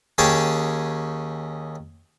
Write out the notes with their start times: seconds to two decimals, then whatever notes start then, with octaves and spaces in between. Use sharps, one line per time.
0.18 D#2 C#4 G#4 C#5 G5 A5